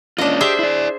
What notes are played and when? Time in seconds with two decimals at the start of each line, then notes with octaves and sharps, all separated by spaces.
0.18 A#3 C#4 D4 F4 D#5
0.41 G4 G#4 C5 E5
0.59 E4 D5